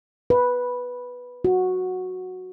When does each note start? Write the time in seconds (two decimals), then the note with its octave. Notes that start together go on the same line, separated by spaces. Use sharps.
0.30 B4
1.45 F#4